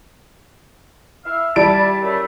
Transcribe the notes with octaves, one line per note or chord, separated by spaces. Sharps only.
E4 E5 F5
G3 E4 D5 A5 D7
F#2 A3